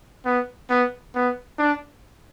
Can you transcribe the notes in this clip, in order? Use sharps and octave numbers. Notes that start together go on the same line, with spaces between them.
B3
B3
B3
D4